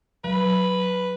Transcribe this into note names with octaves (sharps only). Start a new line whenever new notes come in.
F#3 B4